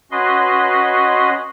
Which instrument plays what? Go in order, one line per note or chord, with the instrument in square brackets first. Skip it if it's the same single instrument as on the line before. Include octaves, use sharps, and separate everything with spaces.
[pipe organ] C#4 F#4 B4 D#5 C6